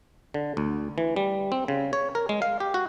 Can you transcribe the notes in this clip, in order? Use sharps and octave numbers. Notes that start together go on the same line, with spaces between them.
D3
D2
E3
G3
C4
C#3
C#5
A#4
G#3
F5
G4
F#4